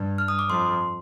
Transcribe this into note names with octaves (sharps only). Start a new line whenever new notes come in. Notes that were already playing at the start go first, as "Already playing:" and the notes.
Already playing: G2
F6
D#6
D6
F2 C6